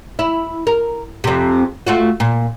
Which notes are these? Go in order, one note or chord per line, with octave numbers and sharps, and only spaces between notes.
E4
A#4
F2 C3
A3 F4 F#4
A#2